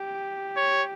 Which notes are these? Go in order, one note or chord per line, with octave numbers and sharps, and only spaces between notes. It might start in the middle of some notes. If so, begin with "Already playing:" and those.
Already playing: G4
C#5